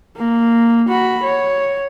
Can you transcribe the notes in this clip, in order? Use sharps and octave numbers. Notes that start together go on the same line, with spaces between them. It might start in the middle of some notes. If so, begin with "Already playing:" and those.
A#3
F#4 B5
C#5